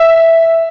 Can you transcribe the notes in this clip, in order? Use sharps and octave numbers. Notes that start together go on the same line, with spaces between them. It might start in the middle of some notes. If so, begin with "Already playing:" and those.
Already playing: E5